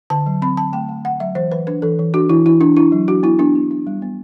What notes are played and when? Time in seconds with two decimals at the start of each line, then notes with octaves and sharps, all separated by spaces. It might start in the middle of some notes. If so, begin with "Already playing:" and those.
0.10 D3 A5
0.26 F#3
0.42 C4 B5
0.57 C4 A5
0.73 A3 G5
0.89 A3
1.05 D3 F#5
1.20 F#3 E5
1.35 E3 C5
1.51 E3 B4
1.67 D4 B4
1.82 E3 A4
1.99 E3
2.14 D4 F#4
2.29 E3 E4
2.46 E3 E4
2.61 D4
2.77 D4 E4
2.92 F#3
3.08 D4 F#4
3.23 B3 E4
3.39 B3 D4
3.55 B3
3.71 D4
3.87 G3
4.02 B3